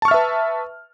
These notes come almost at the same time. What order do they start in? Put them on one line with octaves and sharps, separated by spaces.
A5 C#6 F6 E5 B4